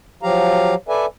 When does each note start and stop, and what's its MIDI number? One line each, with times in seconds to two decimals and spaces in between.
0.23 0.75 53
0.23 0.75 54
0.23 0.75 67
0.23 0.75 77
0.23 0.75 82
0.89 1.06 69
0.89 1.06 71
0.89 1.06 74
0.89 1.06 76
0.89 1.06 80